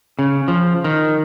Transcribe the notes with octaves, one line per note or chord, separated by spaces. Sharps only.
C#3
F3
D#3